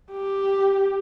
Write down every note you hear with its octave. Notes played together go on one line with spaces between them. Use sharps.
G4